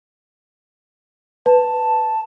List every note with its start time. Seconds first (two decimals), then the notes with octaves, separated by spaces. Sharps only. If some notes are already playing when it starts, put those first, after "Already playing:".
1.46 B4 A5